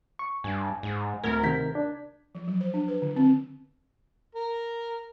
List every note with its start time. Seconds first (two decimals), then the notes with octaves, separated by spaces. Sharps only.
0.19 C#6
0.44 G2 G#5
0.83 G#2
1.23 D1 D2 A#4 G#6
1.43 C3 D#3 G6 B6
1.75 D4
2.35 F3
2.48 F#3
2.61 C5
2.74 D4
2.88 B4
3.02 D3
3.16 C4
4.35 A#4